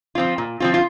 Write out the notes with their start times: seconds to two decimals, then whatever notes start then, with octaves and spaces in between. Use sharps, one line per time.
0.15 F3 C4 F4
0.38 A#2
0.60 F3 C4 F4
0.74 F4